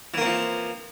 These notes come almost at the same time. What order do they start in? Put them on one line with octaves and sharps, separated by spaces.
E3 A#3 C4 F3